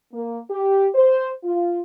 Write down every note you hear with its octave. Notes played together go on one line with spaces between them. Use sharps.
A#3
G4
C5
F4